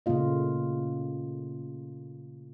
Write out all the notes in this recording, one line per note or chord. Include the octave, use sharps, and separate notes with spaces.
A#2 C#3 A3 A#3 F4 D#5